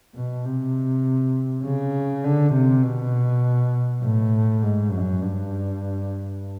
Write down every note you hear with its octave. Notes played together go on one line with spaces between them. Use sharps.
B2
C3
C#3
D3
C3
B2
A2
G#2
F#2
G2